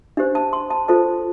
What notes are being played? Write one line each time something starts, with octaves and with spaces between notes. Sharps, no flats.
D4 G4 C5
A5
C6
A5
F4 A4 C5 A5